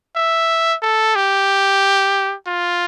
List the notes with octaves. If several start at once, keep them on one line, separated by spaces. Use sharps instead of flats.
E5
A4
G4
F4